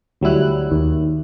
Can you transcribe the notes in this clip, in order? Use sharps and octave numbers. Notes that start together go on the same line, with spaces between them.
D2 F#3 G3 E4 F#6
D#2